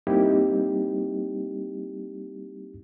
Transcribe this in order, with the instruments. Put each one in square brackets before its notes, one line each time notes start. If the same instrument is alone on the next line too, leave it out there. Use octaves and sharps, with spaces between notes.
[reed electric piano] G3 A#3 C4 D#4 E4 G4